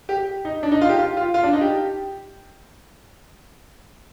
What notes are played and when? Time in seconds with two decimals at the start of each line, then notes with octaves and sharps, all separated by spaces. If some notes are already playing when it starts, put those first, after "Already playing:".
0.09 G4
0.45 D#4
0.63 D4
0.71 D#4
0.81 F4
0.89 G4
0.99 F4
1.17 F4
1.34 F4
1.43 D4
1.53 D#4
1.61 G4